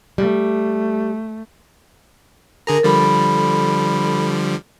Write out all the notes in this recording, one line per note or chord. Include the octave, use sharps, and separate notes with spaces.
G3 A3
D3 G#4 A#4 A#5
D3 F3 G3 A4 B5